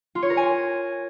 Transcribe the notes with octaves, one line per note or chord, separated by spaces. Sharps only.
F4
C#5
A#4
G#5